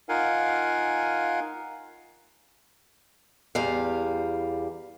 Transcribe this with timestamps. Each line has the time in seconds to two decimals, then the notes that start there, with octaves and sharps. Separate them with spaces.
0.09 D#4 F4 A#4 F5 F#5 G#5
3.55 E2 G3 F5